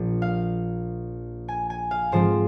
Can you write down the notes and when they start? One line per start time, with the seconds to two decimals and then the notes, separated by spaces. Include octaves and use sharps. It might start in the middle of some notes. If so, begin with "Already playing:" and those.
Already playing: A#1 A#2 F3
0.22 F5
1.48 G#5
1.70 G#5
1.91 F5
2.12 G#2 F3 G#3 C4 C5